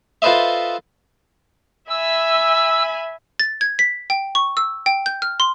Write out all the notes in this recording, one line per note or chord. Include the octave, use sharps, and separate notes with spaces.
F4 A4 B4 C5 D#5 E5
E5 G#5 B5 E6
A6
G#6
B6
G5
C#6
E6
G5
G6
F6
C6